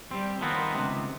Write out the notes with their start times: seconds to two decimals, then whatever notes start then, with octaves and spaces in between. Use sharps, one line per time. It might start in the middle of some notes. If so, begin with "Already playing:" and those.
0.11 G3 C4
0.41 D#3 F3 B3 C4
0.75 C#2 C3